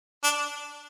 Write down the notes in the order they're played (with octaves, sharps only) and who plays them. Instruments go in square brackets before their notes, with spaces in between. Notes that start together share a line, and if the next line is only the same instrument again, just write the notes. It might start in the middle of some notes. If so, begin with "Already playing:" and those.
[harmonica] D4